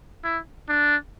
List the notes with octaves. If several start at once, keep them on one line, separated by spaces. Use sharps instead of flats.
E4
D4